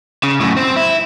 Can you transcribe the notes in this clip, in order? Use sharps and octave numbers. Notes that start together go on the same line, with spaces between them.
C#3
F#2 A2
C4
E4